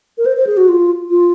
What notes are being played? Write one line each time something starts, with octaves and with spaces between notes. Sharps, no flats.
A#4
C5
C5
G#4
F#4
F4
F4